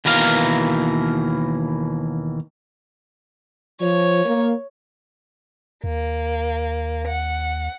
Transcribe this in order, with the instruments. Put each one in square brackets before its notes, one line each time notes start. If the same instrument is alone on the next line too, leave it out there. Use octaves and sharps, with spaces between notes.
[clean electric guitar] D#2 B2 E3 A#4 F5
[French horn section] F3 [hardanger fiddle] C#5
[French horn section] A#3
[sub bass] D#2 [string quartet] A#3
[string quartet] F#5